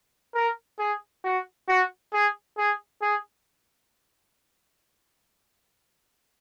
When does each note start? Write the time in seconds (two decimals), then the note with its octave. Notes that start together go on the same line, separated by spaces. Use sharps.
0.35 A#4
0.79 G#4
1.24 F#4
1.68 F#4
2.13 G#4
2.58 G#4
3.02 G#4